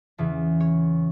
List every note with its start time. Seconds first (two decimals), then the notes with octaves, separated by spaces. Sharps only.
0.18 E2 C#3 E3
0.60 C#5